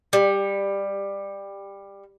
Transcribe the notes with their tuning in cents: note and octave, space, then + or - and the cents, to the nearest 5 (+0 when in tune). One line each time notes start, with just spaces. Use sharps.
G3 +15